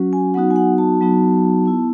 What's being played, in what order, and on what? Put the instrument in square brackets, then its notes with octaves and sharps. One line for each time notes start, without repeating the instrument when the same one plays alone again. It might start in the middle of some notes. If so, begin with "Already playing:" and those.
Already playing: [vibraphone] F#3 C#4 F#4
G#5
F#3 B3 D#4 F#4 F#5
G#5
F#5
A5
F#3 B3 D#4 F#4
B3 E4